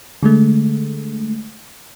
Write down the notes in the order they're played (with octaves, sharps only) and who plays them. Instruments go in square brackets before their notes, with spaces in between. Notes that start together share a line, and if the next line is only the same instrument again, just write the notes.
[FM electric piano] D3 G#3 A3